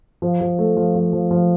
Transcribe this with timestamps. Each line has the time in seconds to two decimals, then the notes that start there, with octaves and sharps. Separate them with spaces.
0.22 F3
0.41 F3
0.58 A3
0.77 F3
0.95 F3
1.13 F3
1.31 F3